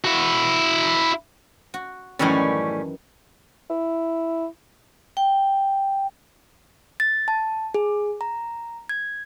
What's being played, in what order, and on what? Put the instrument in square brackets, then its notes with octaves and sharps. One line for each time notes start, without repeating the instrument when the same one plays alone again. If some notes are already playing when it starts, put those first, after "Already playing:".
[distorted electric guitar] E4 F#4
[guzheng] F#4
[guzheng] F#2 D#3 E3 [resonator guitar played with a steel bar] A2 G3 C#4
[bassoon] E4
[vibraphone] G5
[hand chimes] A6
A5
G#4
A#5
G#6